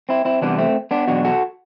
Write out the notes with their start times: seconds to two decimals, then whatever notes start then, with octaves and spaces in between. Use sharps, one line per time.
0.09 C4 E4
0.25 C4 E4
0.41 E2 C3 E3 G3 B3 D4
0.58 A3 C4
0.91 B3 D4
1.07 E2 B2 F#3 D4 F#4
1.25 F#4 A4